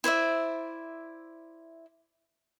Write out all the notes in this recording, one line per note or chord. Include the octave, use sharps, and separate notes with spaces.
E4 C5 D5 E5